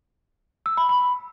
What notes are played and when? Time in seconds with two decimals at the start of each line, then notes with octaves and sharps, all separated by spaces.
0.66 E6
0.77 B5
0.89 B5